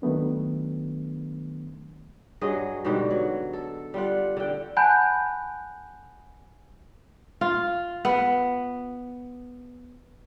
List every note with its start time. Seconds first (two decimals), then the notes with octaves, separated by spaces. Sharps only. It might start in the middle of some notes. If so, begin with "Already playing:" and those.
0.02 D#3 F#3 A3 B3 D4
2.41 G2 F#3 G#4 D#5
2.85 G#2 B2 D3 G3
3.11 F#3
3.53 A4
3.94 G3 F4 F#5
4.37 D3 G5
4.77 F#5 G#5 A5 B5 F#6 G6
7.41 F4
8.05 B3